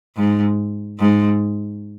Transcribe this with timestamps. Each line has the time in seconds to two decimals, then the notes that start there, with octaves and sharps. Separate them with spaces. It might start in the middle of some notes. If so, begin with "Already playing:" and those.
0.16 G#2
0.99 G#2